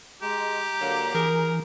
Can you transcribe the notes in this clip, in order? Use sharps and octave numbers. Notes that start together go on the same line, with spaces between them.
G#3 G4 A#5
D3 F#3 A#3
E3 G#4 A#4